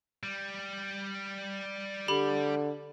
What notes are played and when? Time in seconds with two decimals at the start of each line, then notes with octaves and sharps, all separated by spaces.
0.23 G3
2.08 D3 G4 B5